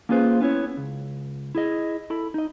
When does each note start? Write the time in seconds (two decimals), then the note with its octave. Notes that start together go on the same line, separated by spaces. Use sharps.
0.09 A#3 C#4 F4 G#4 B4 C5
0.41 B3 C#4 E4 C#5
0.77 C#2
1.55 E4 G#4 D#5
2.10 E4 A4 B5
2.34 D#4 D#5